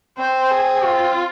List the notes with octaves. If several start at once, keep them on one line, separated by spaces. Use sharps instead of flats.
C4 C5
G#4
F4